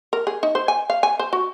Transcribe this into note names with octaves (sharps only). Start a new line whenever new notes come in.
A#4
G#4
D#4
C5
G#5
F5
G#5
C5
F#4